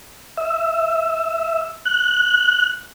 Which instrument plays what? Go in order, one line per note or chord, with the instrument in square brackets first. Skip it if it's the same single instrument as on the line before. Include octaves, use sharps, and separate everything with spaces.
[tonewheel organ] E5
F#6